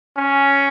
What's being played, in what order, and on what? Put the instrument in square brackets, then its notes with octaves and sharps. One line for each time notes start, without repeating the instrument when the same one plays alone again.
[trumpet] C#4